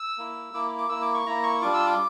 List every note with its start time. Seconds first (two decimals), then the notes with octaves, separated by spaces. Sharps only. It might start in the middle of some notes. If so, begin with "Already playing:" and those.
Already playing: E6
0.18 A#3 E4
0.54 A#3 E4 D6
0.78 D6
0.89 A#3 E4 E6
1.02 D6
1.14 C#6
1.26 A#3 E4 A#5
1.43 C#6
1.61 G3 D4 F4 D6
1.74 E6
1.86 D6